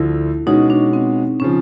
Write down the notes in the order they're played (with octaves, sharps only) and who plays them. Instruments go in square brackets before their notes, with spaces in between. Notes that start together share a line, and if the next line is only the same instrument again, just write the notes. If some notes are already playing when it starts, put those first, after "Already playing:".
Already playing: [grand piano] D2 D3 F3 [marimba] E4
[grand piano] B2 G#3 C#4 F#4 [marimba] D#4
[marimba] D4
C4
[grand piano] C#3 F3 [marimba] C#4